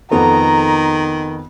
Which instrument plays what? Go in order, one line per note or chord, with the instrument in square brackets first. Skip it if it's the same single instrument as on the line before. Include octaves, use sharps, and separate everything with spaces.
[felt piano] F2 B3 A4 [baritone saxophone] D#3 [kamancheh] A#5